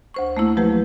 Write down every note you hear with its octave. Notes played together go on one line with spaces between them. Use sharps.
D2 C5 C#6
A3 A#3 E4
F3 F#3 A3 G4 B4